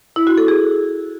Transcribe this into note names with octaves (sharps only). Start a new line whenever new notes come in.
E4
F#4
A4
G#4